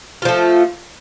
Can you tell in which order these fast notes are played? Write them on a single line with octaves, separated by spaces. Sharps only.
F4 F3 A3